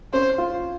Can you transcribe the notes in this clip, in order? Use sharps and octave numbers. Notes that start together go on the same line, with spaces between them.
C#4 C5
F4